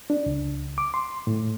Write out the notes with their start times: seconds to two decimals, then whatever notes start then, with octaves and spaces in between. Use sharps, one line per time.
0.10 D4
0.26 C#2
0.78 D6
0.94 C6
1.27 A2